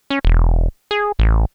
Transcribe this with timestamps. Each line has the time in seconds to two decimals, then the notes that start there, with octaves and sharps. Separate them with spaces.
0.10 C#4
0.25 E1
0.91 G#4
1.19 A1